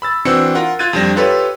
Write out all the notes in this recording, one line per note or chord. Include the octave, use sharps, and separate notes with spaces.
B5 E6 A6
E3 C4 D4 F#4 E6 C#7
F4 A#4 F#5
F4 F#6 G#6 A6 D#7
F2 F3 G3 D4 A#6
F4 G4 A4 B4 C#5